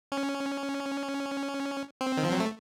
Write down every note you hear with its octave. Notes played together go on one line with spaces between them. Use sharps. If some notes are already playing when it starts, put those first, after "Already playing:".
C#4
C4
D#3
F3
F#3
A3